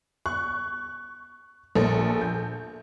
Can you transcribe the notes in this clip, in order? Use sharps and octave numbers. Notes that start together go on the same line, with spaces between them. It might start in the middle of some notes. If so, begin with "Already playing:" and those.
C#6 F#6
A#1 A4
G6